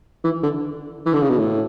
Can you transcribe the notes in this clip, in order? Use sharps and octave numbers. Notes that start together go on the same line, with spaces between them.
E3
D3
E3
D3
C#3
B2
A2